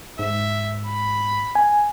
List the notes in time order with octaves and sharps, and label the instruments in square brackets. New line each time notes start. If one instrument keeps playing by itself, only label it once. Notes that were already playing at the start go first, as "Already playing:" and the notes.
[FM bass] G#2 [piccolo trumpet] E5
[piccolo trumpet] B5
[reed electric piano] G#5